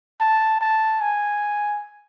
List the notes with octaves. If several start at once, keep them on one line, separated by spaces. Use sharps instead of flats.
A5
A5
G#5